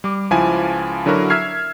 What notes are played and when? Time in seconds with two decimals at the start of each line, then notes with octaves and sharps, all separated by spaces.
0.04 G3 D6
0.31 C#2 F3 E4 F5 G#5
1.06 D3 F#3 E4 F#4 A#4
1.30 E5 E6 F6 G#6 C7